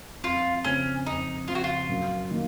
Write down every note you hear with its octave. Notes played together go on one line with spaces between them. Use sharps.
F2 F4
C#3 F3 C4 C#4
F2 D#4
C#3 F3 C4 F4
F#4
F4
F#2
D#3 A#3